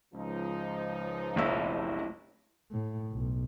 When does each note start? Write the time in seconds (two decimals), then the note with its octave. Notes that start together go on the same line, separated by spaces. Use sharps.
0.14 C#2 F3 D#4
1.36 F#1 B1 F2 A2 E4 E6
2.71 A2
3.12 B1